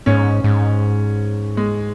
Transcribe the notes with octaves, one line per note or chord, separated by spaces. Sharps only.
G#2 C#4
G#2
G#3